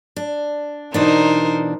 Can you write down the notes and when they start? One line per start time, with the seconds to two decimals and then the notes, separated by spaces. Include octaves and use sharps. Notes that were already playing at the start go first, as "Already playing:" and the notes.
0.16 D4
0.94 B2 E3 D4 D#4 A#4 C5